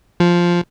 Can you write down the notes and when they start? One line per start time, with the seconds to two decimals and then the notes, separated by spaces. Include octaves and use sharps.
0.20 F3